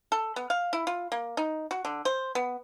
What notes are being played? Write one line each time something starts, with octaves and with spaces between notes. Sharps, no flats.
A4
B3
F5
E4
F4
A#3
D#4
F#4
D3
C5
B3